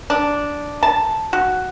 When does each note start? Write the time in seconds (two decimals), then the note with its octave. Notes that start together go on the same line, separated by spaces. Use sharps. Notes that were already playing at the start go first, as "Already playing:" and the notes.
0.10 D4
0.83 A5
1.33 F#4